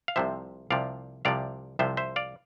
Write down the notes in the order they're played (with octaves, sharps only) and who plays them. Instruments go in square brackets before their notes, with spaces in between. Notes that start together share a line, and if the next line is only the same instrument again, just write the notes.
[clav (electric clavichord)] F5
C2 C3 F3 C5 E5
C2 C3 F3 D5 F5
C2 C3 F3 D5 F5
C2 C3 F3 C5 E5
C5 E5
D5 F5